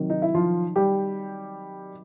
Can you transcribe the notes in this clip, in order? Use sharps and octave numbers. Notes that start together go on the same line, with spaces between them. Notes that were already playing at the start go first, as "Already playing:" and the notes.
Already playing: C3 D#3 F#3
D#4
E4
F3 F4
G3 G4